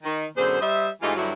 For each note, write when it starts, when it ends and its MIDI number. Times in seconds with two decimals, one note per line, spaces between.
0.03 0.25 51
0.36 0.59 42
0.36 0.59 47
0.36 0.59 50
0.36 0.59 68
0.36 0.59 72
0.60 0.88 55
0.60 0.88 72
0.60 0.88 75
0.60 0.88 76
1.02 1.14 44
1.02 1.14 52
1.02 1.14 57
1.02 1.14 63
1.02 1.14 65
1.02 1.14 67
1.16 1.33 43
1.16 1.33 50
1.16 1.33 54
1.16 1.33 55
1.16 1.33 64
1.16 1.33 66